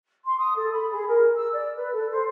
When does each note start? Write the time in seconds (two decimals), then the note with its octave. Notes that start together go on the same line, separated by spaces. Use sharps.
0.25 C6
0.38 D#6
0.56 A4
0.73 B5
0.91 G#4
1.08 A#4
1.37 E6
1.53 D5
1.76 B4
1.92 A4
2.11 C5